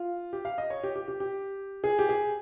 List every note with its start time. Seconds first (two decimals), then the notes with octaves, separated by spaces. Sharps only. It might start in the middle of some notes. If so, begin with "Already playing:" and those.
Already playing: F4
0.33 G4
0.45 F5
0.58 D#5
0.70 C#5
0.83 G4
0.96 G4
1.08 G4
1.20 G4
1.84 G#4
1.99 G4
2.09 G#4